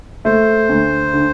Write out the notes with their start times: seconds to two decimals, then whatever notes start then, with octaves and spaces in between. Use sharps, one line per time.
0.25 A3 C5
0.69 D2
1.14 D3